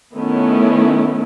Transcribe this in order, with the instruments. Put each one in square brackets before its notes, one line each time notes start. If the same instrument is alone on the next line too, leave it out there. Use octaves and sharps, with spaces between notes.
[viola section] D#3 A3 B3 C#4 E4